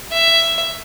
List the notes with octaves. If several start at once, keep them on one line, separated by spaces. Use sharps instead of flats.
E5